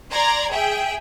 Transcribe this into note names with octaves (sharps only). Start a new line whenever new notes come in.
D5 A#5 C6 G#6
G#4 E5 G5